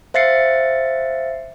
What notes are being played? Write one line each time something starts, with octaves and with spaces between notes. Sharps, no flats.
C5 E5 F5 A6 C7 C#7